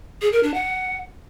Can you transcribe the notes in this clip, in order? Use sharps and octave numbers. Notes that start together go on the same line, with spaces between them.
G#4
A#4
D4
F#5